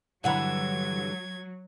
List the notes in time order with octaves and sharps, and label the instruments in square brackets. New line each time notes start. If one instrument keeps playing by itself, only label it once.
[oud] G2 D3 E3 [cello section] F#3 [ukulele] F#5 B5 [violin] G#6